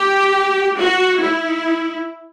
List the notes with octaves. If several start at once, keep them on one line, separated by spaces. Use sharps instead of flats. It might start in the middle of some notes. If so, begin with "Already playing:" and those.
Already playing: G4
F#4
E4